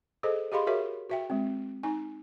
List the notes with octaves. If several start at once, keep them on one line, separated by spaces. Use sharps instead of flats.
G#4 A4 C5 D#5
G4 G#4 D#5 F5 B5 C6
F#4 G#4 A#4 C#5 E5
F#4 E5 G5
G#3 C4
D#4 G#5